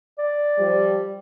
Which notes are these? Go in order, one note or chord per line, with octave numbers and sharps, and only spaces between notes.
D5
F3 G3